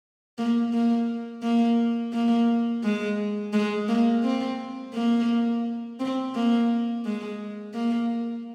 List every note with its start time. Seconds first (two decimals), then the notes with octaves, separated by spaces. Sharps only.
0.38 A#3
0.73 A#3
1.42 A#3
2.13 A#3
2.83 G#3
3.53 G#3
3.88 A#3
4.23 C4
4.93 A#3
5.99 C4
6.35 A#3
7.05 G#3
7.74 A#3